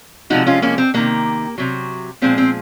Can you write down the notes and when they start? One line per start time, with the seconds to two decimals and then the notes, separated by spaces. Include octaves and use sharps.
0.30 C3 F3 G#3 D#4 F#4
0.47 C#4 F4
0.62 A#3 C#4
0.78 C4
0.94 C3 D#3 G#3 A#3
1.58 C3 F#3
2.22 A#2 F3 G#3 C4
2.38 C4